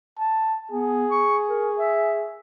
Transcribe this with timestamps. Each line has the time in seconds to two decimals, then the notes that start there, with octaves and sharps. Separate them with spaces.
0.19 A5
0.72 B3 G#4
1.11 C#6
1.49 A#4
1.79 E5